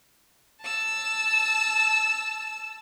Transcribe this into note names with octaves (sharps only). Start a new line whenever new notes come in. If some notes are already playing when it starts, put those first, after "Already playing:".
A5 E6